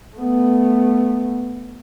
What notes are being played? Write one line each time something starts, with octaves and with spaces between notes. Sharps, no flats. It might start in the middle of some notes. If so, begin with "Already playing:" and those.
A3 B3